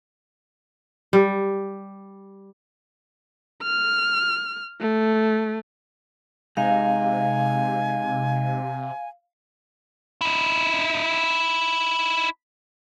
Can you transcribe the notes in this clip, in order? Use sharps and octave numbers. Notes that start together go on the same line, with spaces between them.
G3
F6
A3
C3 G#3 D#4 F5 G#5
D#4 E4